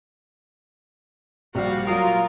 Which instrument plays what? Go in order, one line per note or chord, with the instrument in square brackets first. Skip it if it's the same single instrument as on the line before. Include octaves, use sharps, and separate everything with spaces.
[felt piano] A#1 [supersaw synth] G3 [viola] F#4 F5
[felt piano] F#3 D#6 [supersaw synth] F4 [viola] A#4 [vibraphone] F5